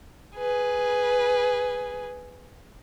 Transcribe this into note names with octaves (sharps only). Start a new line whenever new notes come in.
G#4 B4